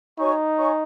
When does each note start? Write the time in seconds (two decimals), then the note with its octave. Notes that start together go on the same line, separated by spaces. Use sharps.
0.18 D#4 F#4 C#5 G#5 C#6
0.56 F#4 C#5 G#5 C#6